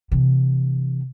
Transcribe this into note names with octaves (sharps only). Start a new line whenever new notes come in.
C3 E3